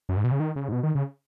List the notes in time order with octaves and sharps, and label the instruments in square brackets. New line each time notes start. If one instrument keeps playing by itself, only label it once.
[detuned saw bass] F#2
G#2
B2
C#3
D#3
C#3
G#2
B2
D#3
C#3